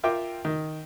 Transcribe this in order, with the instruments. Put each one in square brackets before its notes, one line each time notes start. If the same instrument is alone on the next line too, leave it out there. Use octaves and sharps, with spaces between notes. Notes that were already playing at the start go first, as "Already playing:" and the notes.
[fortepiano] F4 A#4 E5 G5 D6
D#3